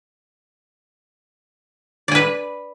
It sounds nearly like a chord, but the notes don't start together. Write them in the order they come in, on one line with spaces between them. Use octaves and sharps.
D5 G#5 B4